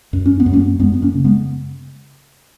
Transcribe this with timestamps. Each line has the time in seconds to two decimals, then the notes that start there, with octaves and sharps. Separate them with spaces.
0.13 F#2
0.26 C#4
0.40 B3
0.46 F#2
0.53 A#3 C#4
0.79 F#2 G#3 B3
0.94 B3
1.02 A#3 C#4
1.14 C#3
1.24 G#3 B3